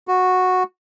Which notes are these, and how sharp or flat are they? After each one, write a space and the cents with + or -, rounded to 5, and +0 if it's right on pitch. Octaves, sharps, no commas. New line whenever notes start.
F#4 -10